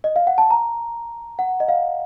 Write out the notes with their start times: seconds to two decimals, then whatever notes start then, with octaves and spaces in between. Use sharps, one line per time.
0.04 D#5
0.16 F5
0.27 F#5
0.38 A5
0.51 A#5
1.39 F#5
1.60 D#5
1.68 F5